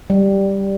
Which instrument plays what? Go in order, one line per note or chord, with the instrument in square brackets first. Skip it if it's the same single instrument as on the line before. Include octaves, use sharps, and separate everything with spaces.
[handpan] G3